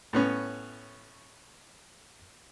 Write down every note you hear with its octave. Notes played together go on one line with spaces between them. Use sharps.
A2 B3 C#4